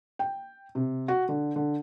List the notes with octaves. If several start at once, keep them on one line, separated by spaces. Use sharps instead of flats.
G5
C3
F#4
D3
D3